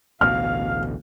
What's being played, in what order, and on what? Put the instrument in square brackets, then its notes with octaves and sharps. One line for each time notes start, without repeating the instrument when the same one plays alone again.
[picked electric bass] A1 D2 B2 [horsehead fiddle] F5 [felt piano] F6